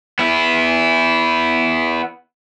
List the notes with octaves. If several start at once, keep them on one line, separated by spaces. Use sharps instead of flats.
B3 E4